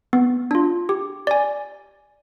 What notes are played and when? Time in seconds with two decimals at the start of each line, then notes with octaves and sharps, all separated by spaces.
0.13 B3
0.51 D4 F4
0.89 G4
1.27 D5 G#5